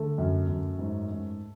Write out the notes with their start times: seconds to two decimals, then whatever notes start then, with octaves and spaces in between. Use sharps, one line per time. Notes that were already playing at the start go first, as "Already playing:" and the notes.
Already playing: D3 A3
0.18 F#2
0.48 F#2
0.79 G#2
1.11 G#2